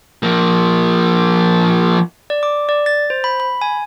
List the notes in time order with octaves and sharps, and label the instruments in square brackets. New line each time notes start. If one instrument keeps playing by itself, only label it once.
[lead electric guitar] F3 A#3
[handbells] D5
D6
D5
A6
C5
B5
B5
G#5